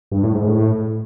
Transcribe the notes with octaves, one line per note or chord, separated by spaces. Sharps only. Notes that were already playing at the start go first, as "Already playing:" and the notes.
G2
A2
G#2
A2